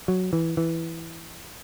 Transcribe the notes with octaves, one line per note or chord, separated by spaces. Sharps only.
F#3
E3
E3